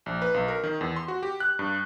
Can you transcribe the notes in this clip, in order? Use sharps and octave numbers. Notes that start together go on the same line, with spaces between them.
A#1
B4
B1
A#4
D#3
E2
C6
F#4
G4
F#6
G2